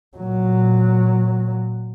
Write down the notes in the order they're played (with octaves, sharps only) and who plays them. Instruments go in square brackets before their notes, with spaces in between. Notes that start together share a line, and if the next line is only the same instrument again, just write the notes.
[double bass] A#2 F#3